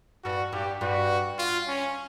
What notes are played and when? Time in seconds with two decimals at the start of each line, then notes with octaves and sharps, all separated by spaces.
0.24 G2 F#4
0.53 G2 G4
0.81 G2 F#4
1.39 F4
1.68 C#4